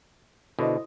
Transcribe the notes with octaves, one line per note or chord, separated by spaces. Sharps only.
B2 D3 E4 C5 D#5